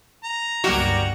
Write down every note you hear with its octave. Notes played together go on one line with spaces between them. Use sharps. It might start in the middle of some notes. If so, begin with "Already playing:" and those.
A#5
G1 C#2 G2 F#3 G3 A#3 F#4